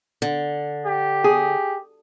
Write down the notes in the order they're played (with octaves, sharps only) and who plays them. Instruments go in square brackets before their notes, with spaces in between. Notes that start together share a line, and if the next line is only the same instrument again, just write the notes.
[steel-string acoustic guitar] D3
[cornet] G4
[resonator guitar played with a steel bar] G#4